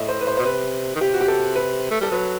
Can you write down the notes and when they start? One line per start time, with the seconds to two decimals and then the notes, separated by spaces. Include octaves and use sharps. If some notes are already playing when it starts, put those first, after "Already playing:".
Already playing: A2 D#5 E5
0.09 C5
0.21 B4
0.27 C5
0.37 B2 C5
0.45 C3 B4
0.95 D#3
1.01 C3 G4
1.14 F#4
1.21 G4
1.28 A4
1.56 B4
1.91 A3
2.01 G3 A4
2.11 F#3 B4